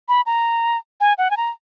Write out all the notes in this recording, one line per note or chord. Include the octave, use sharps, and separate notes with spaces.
B5
A#5
G#5
F#5
G#5
A#5